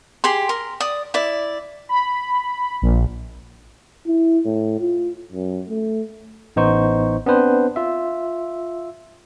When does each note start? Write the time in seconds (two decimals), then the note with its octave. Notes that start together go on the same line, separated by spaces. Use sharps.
0.24 G4 G#4 C6
0.49 A#4 C6
0.80 D5 D#6
1.14 E4 D5
1.89 B5
2.82 A#1
4.07 E4
4.45 A2
4.81 F4
5.32 F#2
5.69 A3
6.56 A1 B3 D#4 C5 C#6
7.26 B3 C4 D4 B4 C5
7.76 F4 E5